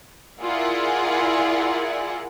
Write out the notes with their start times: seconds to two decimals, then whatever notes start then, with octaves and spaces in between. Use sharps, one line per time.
0.41 E4 F4 G#4 A#4 D5 F#5